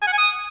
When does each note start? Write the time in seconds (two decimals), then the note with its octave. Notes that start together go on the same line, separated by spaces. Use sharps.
0.02 G#5
0.07 F#5
0.13 G#5
0.18 D#6